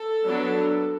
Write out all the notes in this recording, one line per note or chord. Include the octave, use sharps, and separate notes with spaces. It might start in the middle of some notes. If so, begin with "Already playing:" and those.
Already playing: A4
F#3 B3 D4